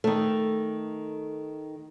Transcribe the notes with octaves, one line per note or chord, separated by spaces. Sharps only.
D#3 A3